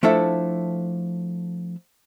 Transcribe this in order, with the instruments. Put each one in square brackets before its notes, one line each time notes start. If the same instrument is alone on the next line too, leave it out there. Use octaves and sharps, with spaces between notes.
[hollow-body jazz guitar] F3 A3 D4 E4 A4 E5